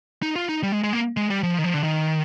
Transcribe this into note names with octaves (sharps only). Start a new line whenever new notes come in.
D#4
F4
D#4
G3
G#3
G#3
A#3
G#3
G3
F3
D#3
F3
D3
D#3